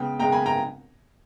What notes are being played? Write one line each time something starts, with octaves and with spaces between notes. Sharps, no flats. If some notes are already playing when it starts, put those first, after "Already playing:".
Already playing: C#3 G#3 B3 G5
C#3 G#3 B3 G5 A#5
G#5 B5
G5 A#5